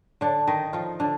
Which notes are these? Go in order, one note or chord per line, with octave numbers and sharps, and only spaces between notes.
D3 D4
D#3 D#4
F3 F4
D3 D4